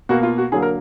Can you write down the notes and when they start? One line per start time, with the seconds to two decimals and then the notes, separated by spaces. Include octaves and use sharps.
0.09 B2 A#3 F#4
0.23 F4
0.38 F#4
0.52 D3 F#3 A#3 G#4
0.62 A#4